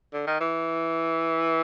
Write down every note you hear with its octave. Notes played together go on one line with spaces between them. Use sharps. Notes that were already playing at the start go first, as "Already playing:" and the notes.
D3
D#3
E3